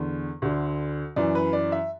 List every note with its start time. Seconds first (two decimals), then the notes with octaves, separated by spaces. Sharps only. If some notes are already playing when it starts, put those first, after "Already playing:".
Already playing: E2 D3
0.42 D2 D3
1.16 F#2 E3 D5
1.35 B4
1.53 D5
1.72 E5